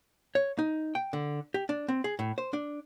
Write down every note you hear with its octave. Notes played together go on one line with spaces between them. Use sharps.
C#5
D#4
G5
D3
G4
D4
C4
G#4
A2
C5
D4